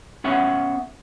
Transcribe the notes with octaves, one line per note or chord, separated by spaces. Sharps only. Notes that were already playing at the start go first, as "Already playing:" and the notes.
B3 C#4 E5 F#5